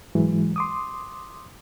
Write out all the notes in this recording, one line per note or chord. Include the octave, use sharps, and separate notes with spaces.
G#2 E3 F#3 G#3
C6 D6 D#6